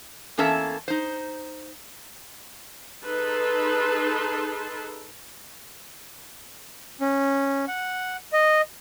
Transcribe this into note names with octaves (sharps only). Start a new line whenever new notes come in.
E2 A#3 C#4 A4 E5 A5
D#4 C5
D#4 G#4 A4 B4 A5 C6
C#4
F#5
D#5